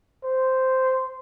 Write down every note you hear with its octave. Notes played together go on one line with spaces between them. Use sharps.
C5